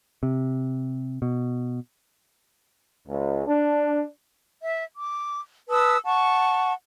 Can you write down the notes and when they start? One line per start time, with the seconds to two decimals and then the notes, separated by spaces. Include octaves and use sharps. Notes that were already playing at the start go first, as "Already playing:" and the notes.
0.23 C3
1.22 B2
3.07 C#2
3.47 D4
4.62 E5
4.93 D6
5.70 B4 A5 D#6 E6
6.05 F#5 A5 C#6